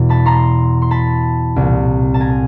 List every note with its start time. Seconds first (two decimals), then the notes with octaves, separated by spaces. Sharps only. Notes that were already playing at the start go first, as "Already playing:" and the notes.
Already playing: E2 B2
0.09 A5 B5
0.26 A#5 C6
0.82 C6
0.91 A5 B5
1.56 C2 A#2
2.14 A5
2.20 G#5 A#5